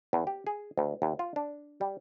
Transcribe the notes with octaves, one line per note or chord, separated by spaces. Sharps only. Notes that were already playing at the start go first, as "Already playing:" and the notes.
E2
G4
G#4
D2
D#2
F4
D4
G3